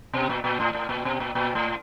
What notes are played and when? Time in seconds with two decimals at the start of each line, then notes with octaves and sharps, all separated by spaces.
0.13 B2
0.29 A#2
0.44 A#2
0.60 A2
0.75 A2
0.89 A#2
1.05 B2
1.20 A#2
1.35 A#2
1.55 A2